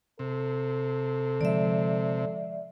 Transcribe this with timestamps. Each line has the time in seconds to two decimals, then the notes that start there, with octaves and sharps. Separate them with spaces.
0.19 C3 A4
1.41 D3 F3 G#3 D5 E5